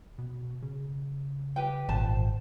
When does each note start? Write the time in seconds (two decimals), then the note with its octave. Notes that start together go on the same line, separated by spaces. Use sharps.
0.18 B2
0.62 C#3
1.56 G4 B4 G5
1.89 G#1 A#2 C5 A5